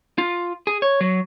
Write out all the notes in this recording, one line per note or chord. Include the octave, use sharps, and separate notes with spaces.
F4
G#4
C#5
F#3